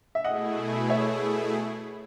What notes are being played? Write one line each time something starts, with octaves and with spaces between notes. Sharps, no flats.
E5
B2 A3 E4 G#4 D#5 F#5
C#5 E5